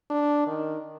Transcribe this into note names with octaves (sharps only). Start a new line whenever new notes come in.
D4
D#3